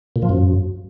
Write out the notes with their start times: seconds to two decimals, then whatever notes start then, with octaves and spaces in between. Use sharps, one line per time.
0.16 A#2
0.22 F3
0.29 F#2